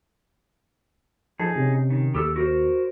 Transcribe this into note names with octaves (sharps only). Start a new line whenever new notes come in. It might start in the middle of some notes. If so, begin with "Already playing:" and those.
F3 D#4 G#4 A4 A5
C3 C#4
D#3
D#2 G4 A4 E6
F#4 A#4 C5